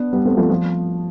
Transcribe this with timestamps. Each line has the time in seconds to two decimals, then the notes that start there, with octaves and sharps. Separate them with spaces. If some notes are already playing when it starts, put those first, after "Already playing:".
Already playing: B3 D4
0.13 G3 B3
0.25 A3 C4
0.37 F3 A3
0.50 F3